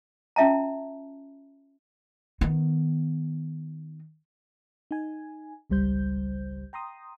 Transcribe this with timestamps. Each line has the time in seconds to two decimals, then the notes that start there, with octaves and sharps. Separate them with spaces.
0.36 C#4 F4 E5 A5 A#5
2.41 D#3 B3
4.91 D#4 G#5
5.70 G#1 C#2 G3 C5 G6
6.73 G5 A#5 C6 D#6